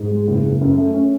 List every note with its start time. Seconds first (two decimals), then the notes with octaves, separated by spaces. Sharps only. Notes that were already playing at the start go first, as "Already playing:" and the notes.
Already playing: G#2
0.11 G#3
0.27 F#1
0.44 F#1
0.61 F#2
0.77 A3
0.94 C#4